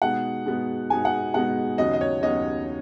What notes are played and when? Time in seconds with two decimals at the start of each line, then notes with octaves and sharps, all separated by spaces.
0.02 B2 G#3 B3 D#4 F#5
0.46 B2 G#3 B3 D#4
0.90 B2 G#3 B3 D#4 G#5
1.05 F#5
1.34 B2 G#3 B3 D#4 F#5
1.78 D#2 C#3 F#3 B3 D#4 D#5
1.94 D#5
2.01 C#5
2.22 D#2 C#3 F#3 B3 D#4 D#5